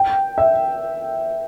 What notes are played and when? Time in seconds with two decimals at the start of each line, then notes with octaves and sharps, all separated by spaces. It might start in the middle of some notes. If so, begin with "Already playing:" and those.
Already playing: G5
0.38 E5